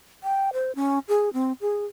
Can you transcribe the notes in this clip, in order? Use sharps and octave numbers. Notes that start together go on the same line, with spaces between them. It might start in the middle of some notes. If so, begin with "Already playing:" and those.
G5
C5
C#4
G#4
C4
G#4